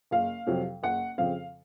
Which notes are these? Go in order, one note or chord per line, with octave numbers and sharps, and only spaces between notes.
F#1 F5
F2 C3 F#3 C4
F#1 F#5
F2 C#3 F3 C4 F5